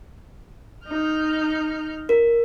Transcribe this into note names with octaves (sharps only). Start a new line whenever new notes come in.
D#4 F6 G6
A#4